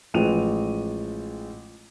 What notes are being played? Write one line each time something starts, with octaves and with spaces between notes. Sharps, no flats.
A1 F3 G#3 D#7 F7